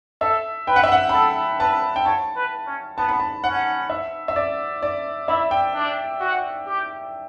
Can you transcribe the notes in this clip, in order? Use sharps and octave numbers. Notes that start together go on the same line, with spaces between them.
A4 E5
B4 G5
F#5
E5
F#5
B5
A4 A5
B4 A5
G5
C#5 A5
B4
C#4
B3 A5
B5
A5
C#4 F#5
E5
E5
D5
D5
E4 E5
G5
D4
F#4
G4